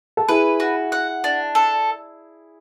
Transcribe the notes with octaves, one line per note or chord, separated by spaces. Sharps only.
A4
E4 G#4 B4
F#4
F#5
D4
A4